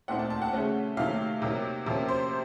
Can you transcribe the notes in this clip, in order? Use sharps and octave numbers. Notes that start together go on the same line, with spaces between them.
A#2 A3 C4 D#4 F#5
A5
A5
F#5
C#3 A3 C#4
C3 D#3 F#3 A3 F5
C3 F#3 A#3 D#4
C3 F3 A#3 C#4
C5